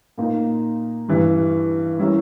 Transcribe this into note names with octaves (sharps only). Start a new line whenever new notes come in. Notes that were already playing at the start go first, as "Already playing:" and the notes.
A#2 A#3 D#4
G2 E3 G3
G3 C#4 E4 A#4